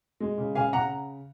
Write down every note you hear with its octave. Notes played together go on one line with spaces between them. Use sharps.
G#3
C#3
C#3 F5 G#5
C#3 F#5 A#5